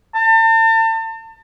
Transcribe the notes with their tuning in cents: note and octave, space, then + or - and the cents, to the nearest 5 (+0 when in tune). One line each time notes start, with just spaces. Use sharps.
A5 +40